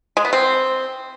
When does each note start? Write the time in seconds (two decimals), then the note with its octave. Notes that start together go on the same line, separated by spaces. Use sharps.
0.17 G#3
0.25 B3
0.33 C4